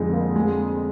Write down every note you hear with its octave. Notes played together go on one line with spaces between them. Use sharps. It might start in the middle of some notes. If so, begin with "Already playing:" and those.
Already playing: F2 D3 F3 G3 G#3 C4 D#4
A#3
G#3